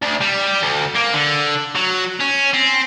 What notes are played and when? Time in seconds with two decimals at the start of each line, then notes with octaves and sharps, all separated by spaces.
0.02 D2
0.21 G3
0.62 D2
0.95 A#3
1.13 D3
1.75 F#3
2.20 C#4
2.53 C4